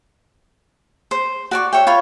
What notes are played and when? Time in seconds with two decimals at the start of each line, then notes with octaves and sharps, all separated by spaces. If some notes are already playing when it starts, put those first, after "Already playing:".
1.11 C5
1.51 F#4 D5 C#6
1.73 C#5 E5 G5
1.87 F4 C#5 B5 C#6